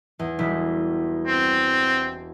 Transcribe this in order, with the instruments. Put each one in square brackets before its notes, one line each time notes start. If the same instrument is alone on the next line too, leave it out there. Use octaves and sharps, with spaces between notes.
[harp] E2
E1 G3 E4
[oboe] C4